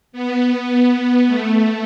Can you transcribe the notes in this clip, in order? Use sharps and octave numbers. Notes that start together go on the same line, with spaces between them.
B3
A3